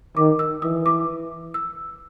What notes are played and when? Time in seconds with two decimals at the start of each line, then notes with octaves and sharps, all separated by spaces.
0.17 D#3 D6
0.39 E6
0.62 E3 D#6
0.86 D6
1.54 E6